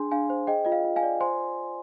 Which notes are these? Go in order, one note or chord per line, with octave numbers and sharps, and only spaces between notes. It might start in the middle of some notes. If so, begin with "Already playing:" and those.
Already playing: D4 G#4 G#5 C6
D4 F5 G#5
C5
G#4 D#5 G5
F4 D#5
F5
F4
F5 G#5
D5
C5 G#5 C6